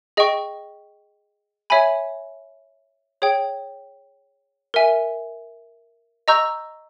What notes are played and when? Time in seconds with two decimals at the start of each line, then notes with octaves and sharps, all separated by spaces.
0.17 G#4 D#5 G5 C#6
1.70 C#5 E5 G#5 B5
3.22 G#4 C#5 G5
4.74 A#4 E5 G#5
6.28 D#5 A#5 C#6 E6 G6